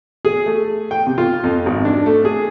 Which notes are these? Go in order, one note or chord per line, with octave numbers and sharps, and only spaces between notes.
G#4
A3
G5
C3
F4
F2
G#1
D4
A3
G#4